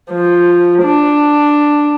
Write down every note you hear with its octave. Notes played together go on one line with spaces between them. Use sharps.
F3
D4